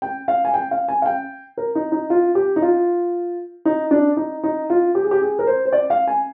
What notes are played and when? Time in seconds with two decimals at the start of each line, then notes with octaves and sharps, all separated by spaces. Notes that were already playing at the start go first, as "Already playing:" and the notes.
0.02 G5
0.28 F5
0.45 G#5
0.54 G5
0.71 F5
0.88 G#5
1.02 F5
1.06 G5
1.57 A#4
1.75 D#4
1.92 D#4
2.10 F4
2.35 G4
2.56 D#4
2.62 F4
3.65 D#4
3.91 D4
4.17 D#4
4.43 D#4
4.70 F4
4.95 G4
5.03 G#4
5.11 G4
5.22 G#4
5.39 A#4
5.47 C5
5.66 C5
5.72 D5
5.90 F5
6.07 G#5